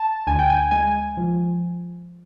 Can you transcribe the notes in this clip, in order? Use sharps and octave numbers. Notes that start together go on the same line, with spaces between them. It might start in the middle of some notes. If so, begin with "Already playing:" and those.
Already playing: A5
D2 G#5
G5
G#5
G#3 G#5
F3